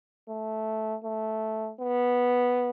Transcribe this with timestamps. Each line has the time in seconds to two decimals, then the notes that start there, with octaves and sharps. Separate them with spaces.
0.28 A3
1.03 A3
1.80 B3